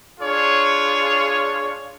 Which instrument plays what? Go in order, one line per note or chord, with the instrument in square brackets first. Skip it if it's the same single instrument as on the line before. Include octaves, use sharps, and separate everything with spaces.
[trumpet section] D4 F4 G#4 C#5